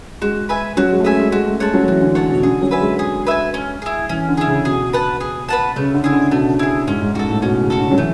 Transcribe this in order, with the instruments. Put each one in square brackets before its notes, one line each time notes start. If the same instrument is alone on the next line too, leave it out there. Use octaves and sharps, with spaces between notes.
[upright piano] G#3 [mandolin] F#4
[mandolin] B4 E5 G#5
[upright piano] F#3 [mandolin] F#4
[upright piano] G#3
A3
[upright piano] G#3 [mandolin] B4 E5 G#5
[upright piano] G#3
[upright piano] G#3 [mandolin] F#4
[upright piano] A3
[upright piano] G#3 [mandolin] C#5 F#5 A5
[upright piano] F#3
[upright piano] E3 [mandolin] F#4
[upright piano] D3
[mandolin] C#5 F#5 A5
[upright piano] B2
[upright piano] D3 [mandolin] G#4
[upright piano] F#3
[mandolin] B4 E5 G#5
[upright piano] G#3
[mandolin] G#4
B4 E5 G#5
C#4
E4 G#4
[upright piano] E3 [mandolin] C#4
[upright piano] D3
[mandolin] E4 G#4
[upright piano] C#3
[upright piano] B2 [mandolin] G#4
[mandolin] B4 F#5 A5
G#4
B4 F#5 A5
[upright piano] C#3 [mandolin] A3
[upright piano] D3
[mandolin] E4 G#4
[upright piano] D3
[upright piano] B2 [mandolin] A3
[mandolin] E4 G#4
[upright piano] G#2 [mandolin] C#4
[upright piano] G#2
[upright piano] G#2 [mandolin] F#4 A4
[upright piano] A2
[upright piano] B2 [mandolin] C#4
[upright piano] C#3
[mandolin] F#4 A4
[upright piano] D3
F#3
[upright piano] E3 [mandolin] A3